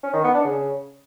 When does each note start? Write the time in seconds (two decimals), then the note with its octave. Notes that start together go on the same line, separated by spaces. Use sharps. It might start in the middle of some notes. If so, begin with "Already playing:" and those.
0.03 C#4
0.14 D#3
0.24 B3
0.34 D4
0.45 C#3